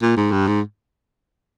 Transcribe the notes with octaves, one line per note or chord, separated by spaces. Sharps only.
A#2
G#2
G2
G#2